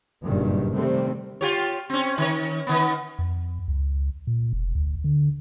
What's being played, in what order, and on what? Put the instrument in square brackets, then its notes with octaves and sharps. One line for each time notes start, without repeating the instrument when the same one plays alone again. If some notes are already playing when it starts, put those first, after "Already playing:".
[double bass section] F#1 G2 A#2 D#3 G3
C3 D#3 G3 A3 C4
[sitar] F4 G4 C#5
C4 C#4
D#3 C#5
D#3 B3
[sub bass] F2
C#2
A#2
F1
D2
D3